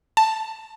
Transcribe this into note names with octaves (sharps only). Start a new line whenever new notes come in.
A5